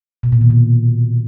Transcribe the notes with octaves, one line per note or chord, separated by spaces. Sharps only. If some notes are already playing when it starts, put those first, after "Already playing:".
B2
A#2
D#3
B2